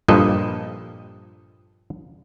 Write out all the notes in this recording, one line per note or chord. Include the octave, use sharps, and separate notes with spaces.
G2 A#2 F3 A4 D#5